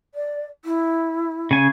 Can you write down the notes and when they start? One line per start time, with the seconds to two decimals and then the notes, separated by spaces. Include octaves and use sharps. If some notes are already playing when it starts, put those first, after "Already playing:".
0.15 D5
0.65 E4
1.51 C#3 G#5